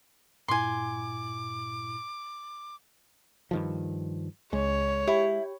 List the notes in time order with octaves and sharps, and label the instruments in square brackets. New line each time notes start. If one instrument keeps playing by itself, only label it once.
[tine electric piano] G2 A#2 E4 [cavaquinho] G#5 C6 [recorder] D6
[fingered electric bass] G2 D#3 F3
[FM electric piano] C#2 [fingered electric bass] G#3 [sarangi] C#5
[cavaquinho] E4 [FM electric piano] G4